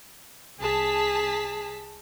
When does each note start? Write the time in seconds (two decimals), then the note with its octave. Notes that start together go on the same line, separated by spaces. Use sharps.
0.60 C2 G#4 A5 B6